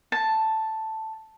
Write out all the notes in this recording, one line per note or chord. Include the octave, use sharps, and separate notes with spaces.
A5